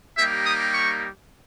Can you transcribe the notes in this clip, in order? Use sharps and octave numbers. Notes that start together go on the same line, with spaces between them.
G3 A#3 D#4 G4 E5
D#6
C#6